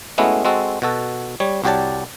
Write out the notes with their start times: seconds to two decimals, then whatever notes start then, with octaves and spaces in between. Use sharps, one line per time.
0.18 G#3 A3 B3 C#4 E4 F#4
0.45 G#3 C4 F#4 A4
0.82 B2 F#4 A4
1.40 G3 C#5
1.64 C2 F#4 G4 C#5 D5 A5